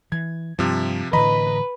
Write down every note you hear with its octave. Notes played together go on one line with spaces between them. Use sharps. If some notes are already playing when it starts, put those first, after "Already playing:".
E3 G#6
G2 C3 F3
A2 D3 E3 B4 D#5 A#5 B5